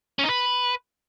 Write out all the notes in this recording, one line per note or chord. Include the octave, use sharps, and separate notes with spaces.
C#4
D#4
B4